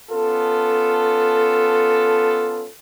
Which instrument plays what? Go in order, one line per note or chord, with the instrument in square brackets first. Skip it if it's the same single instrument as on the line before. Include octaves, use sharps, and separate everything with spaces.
[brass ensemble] B3 C#4 F4 A4